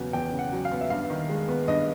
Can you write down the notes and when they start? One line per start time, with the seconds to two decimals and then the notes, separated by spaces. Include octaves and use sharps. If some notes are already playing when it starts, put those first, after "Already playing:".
Already playing: E2 C#3 F#3 B3
0.13 E2 G5
0.33 C#3
0.39 F#5
0.53 F#3
0.65 F5
0.71 B3
0.81 E5
0.90 G2 F5
1.10 D#3
1.29 G#3
1.49 B3
1.68 G2 D#5